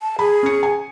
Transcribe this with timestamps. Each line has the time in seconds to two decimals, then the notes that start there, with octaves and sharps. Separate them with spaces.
0.01 A5
0.19 G#4 B5
0.43 C#4 C#7
0.63 G#5